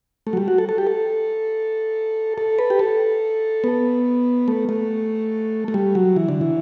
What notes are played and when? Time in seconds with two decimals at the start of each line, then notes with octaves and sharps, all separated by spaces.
0.27 A3
0.33 F#3
0.37 G3
0.48 F#4
0.58 A4
0.69 A4
0.78 G4
0.87 A4
2.38 A4
2.59 B4
2.70 G4
2.79 A4
3.64 B3
4.48 A3
4.69 A3
5.68 A3
5.74 G3
5.95 F#3
6.16 E3
6.29 D3
6.41 E3